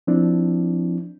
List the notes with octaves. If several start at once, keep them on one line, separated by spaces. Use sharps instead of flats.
F3 C4 D4 E4